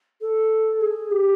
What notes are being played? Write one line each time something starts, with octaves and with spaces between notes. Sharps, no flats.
A4
G#4
G4